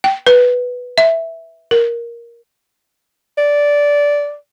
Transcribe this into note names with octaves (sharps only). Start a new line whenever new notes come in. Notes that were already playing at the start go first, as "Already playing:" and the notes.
G5
B4
E5
A#4
D5